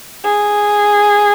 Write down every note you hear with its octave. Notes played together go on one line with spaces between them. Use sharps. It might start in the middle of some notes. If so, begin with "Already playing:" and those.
G#4